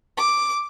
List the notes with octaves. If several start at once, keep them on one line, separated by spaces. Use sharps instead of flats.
D6